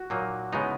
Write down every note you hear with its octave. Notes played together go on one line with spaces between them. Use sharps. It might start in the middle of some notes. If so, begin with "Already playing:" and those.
Already playing: F#4
A#2 F#3 A#3 D#4
C#3 G#3 B3 D#4 E4